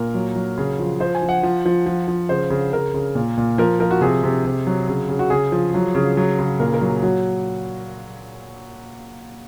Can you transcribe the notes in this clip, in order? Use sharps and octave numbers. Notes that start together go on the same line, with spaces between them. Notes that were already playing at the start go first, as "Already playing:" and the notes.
Already playing: A#2 A#4
F#3
F#3
C#3
F3
F3 C5
G#5
F3
F#5
F3
F3
F3
F3
C#3 C5
C#3
C#3 A#4
C#3
A#2
A#2
F3 A#4
F3 A#4
F#4
C3 G#4
C3
C3
F#3
C#3
C#3
F#4
C#3 G#4
F3
F#3
C#3
F#3
C#3
A#2 A#4
A#4
F#3
G#4
F#3 F#4